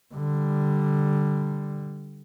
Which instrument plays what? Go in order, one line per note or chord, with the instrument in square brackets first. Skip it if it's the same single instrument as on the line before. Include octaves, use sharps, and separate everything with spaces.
[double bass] D3 G3